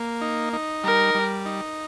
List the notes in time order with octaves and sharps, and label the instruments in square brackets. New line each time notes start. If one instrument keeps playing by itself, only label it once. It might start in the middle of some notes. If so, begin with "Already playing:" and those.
Already playing: [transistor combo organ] A#3
D#4
D#4
[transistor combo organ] G3 [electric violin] A#4
[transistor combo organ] G3
D#4